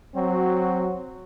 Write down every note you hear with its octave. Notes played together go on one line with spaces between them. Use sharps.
F#3 C4 F#4